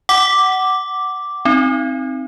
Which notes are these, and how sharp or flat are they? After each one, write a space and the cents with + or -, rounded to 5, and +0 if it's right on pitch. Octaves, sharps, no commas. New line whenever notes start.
F#5 +15 D6 +0
C4 +0 D#4 +0